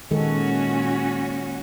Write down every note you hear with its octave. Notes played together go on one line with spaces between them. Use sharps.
A#2 D#3 G#3 C#4 F#4 A4